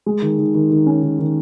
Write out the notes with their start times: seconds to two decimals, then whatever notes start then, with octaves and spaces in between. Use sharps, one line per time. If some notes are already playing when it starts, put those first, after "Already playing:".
0.06 G#3
0.22 D#3
0.38 D#3
0.55 D#3
0.71 D#3
0.86 C#4
1.03 D#3
1.19 D#3